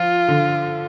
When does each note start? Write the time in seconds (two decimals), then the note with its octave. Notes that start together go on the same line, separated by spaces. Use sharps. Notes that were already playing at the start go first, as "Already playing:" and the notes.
Already playing: F3 F4
0.28 D3